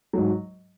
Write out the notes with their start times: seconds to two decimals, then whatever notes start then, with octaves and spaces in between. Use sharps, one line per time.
0.13 G#2 F#3